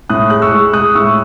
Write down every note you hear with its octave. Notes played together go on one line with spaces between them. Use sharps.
A2 D#6 F#6
G#3 F#6
C#6 E6
G#3
G#3 D#6 F#6
A2 C#6 E6